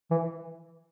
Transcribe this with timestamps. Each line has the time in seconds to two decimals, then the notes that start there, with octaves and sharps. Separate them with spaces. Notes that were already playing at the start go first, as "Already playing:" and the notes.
0.10 E3